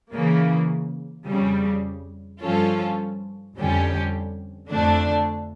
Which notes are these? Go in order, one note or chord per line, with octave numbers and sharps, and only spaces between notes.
C#3 E3 A#3
F2 C#3 G3
G2 F3 C#4 F4 A4
F2 D3 G3 C#4 G4
F2 D3 A3 D4